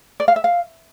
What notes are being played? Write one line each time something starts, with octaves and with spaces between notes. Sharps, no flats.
D5
F5
E5
F5